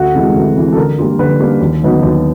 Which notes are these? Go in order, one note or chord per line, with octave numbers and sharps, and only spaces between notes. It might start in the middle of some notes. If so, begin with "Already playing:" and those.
Already playing: D2 F#4
C3 E3 G#3
D2
C3 E3 G#3
A4
D3 A#4
G3 A#3 D4 F4
D3 B4
G3 A#3 D4 F4
D#2
D3 F#3 B3 D#4
D#2